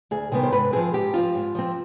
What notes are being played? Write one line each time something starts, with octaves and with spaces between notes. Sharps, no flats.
D2 G#4
C3 D#3 G3 B3 G#4
C5
G#2 B4
F3 C4 G#4
G#2 G4
F3 C4 F4
G#2
F3 C4